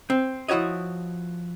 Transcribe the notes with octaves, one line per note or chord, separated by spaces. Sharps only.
C4
F3 E4 F#4 C#5 D#5